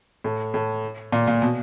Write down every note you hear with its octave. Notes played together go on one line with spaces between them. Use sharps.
A2
A2
A#2
A#2
B2